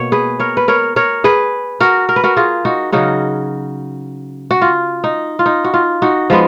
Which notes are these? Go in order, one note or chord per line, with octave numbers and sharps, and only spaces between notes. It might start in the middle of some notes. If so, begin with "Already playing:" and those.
Already playing: B2 A#3 C#5
G#4 B4
A#4 C#5
B4
A#4 C#5
A#4 C#5
G#4 B4
F#4 A#4
A#4
B4
F#4 A#4
F4 G#4
D#4 F#4
C#3 F#3 C#4 D#4 F#4
F#4
F4
D#4
F4
D#4
F#4
F4
D#4 F#4
F3 G#3 B3